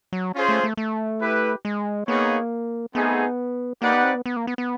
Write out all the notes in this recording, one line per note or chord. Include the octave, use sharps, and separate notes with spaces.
F#3
C#4 F4 G#4 C5
A3
A3
A3
E4 G4 B4
G#3
A#3 B3 D#4 G#4 C#5
A3 B3 C4 D#4 G#4
A#3 D#4 G4 B4 D5 F#5
B3
C4
B3
B3
A#3
B3
B3